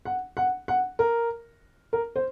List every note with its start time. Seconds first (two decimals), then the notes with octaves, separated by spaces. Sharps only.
0.05 F#5
0.37 F#5
0.68 F#5
0.99 A#4
1.93 A#4
2.16 C5